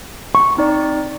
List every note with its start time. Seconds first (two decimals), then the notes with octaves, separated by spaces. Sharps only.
0.35 C#6
0.57 C4 D#4 D5